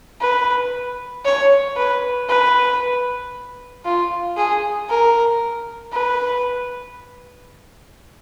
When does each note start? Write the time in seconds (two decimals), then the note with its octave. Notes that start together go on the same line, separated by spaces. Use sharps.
0.21 B4
1.25 C#5
1.77 B4
2.29 B4
3.85 F4
4.37 G#4
4.89 A#4
5.92 B4